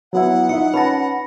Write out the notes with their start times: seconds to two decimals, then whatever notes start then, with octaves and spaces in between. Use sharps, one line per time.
0.13 F#3 B3 E4 F#5
0.49 D#4 F4 D#5 E5 C#7
0.74 C#4 B4 A5 B5 A#6